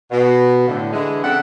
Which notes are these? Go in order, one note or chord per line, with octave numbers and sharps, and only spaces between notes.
B2
A2 D3
D3 E3 G#3
C#3 C4 D4 A4 E5 F#5